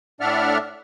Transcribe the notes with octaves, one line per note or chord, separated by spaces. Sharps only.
A2 D4 D5 E5 F#5 F6